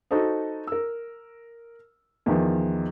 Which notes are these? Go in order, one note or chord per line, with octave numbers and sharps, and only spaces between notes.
D#4 F#4 A4 C5 D#5
A#4 E6
E2 D#3 F3